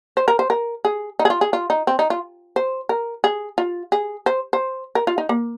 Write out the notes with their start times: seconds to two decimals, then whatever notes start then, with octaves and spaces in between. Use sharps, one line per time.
0.17 C5
0.28 A#4
0.39 C5
0.50 A#4
0.85 G#4
1.19 D#4
1.25 G#4
1.30 F4
1.41 G#4
1.53 F4
1.70 D#4
1.87 C4
1.99 D#4
2.10 F4
2.56 C5
2.89 A#4
3.24 G#4
3.58 F4
3.92 G#4
4.26 C5
4.53 C5
4.95 A#4
5.07 F4
5.18 D#4
5.29 A#3